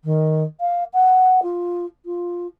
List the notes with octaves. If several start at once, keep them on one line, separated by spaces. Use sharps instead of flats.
D#3
F5
F#5
F4
F4